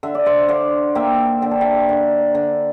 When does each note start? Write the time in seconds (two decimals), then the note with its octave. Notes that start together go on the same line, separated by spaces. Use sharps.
0.03 D3 E5
0.15 D5
0.26 C5 E5
0.48 D3 D5 F5
0.95 A#3 E5 G5
1.42 D3 G5
1.51 A5
1.61 E5 G5
1.89 D3
2.35 D3